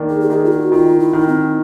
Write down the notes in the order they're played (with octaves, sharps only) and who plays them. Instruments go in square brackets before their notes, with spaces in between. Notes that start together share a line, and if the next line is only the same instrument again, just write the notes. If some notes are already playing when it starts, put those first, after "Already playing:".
Already playing: [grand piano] D#3 A#3 D4
[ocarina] G#4
G4
[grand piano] D#3 [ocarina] G#4
[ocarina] F4
F#4
[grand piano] D#3 [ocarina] F4
[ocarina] E4
[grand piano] D#3
[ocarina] C4